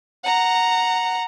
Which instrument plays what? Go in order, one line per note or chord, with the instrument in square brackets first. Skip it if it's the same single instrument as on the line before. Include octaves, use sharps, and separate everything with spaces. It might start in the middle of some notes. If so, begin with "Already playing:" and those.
[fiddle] F#5 A#5